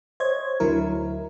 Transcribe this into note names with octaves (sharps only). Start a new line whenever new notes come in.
C5 C#5 D#5 G#6
D2 D3 F#3 E4 A#4